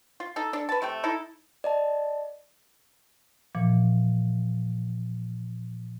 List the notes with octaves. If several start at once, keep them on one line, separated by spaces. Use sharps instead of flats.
F4
D#4 A4
D4 A4
B4 A5
C3 A3 G5
D#4 E4 A4
D5 D#5 A5
A#2 E3 F3